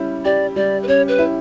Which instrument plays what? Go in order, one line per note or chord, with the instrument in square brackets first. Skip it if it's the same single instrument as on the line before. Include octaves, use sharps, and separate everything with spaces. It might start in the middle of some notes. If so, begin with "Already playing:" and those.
Already playing: [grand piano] G3 C#4 E4
[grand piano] G4 [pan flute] D5
[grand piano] G3 [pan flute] D5
[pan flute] B4
[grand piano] C#4 [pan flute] C#5
[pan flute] B4
[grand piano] E4